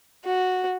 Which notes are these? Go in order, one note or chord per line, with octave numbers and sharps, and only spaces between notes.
F#4